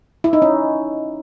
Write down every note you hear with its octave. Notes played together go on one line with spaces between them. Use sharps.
E4
D#4
C#4